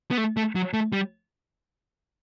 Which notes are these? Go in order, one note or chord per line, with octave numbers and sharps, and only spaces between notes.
B3
A3
A3
F#3
A3
G3